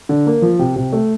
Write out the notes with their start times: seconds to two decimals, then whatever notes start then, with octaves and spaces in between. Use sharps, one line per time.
0.09 D3
0.27 A#3
0.42 F3
0.59 C3
0.76 C3
0.93 A3